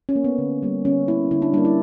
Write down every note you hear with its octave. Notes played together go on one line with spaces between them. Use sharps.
C#4
A#3
B3
D3
G3 A#3
D3 C#4
A#3 E4
D3 E4
D4
G3 A#3 D4
E4